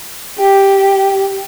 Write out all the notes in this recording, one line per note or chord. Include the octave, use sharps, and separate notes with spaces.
G4